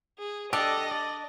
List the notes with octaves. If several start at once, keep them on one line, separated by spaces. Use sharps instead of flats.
G#4
D4 G4 A4 D5 D#5
D5